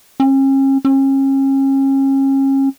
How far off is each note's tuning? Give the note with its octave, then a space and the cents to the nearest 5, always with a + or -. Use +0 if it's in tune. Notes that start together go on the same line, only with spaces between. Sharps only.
C#4 -40
C#4 -35